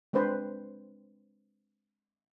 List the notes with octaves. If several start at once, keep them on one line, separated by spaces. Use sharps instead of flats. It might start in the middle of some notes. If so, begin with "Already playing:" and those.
G#3 C4 D4 B4 C5